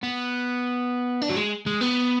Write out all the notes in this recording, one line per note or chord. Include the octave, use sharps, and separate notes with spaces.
B3
D4
F#3
G#3
G#3
B3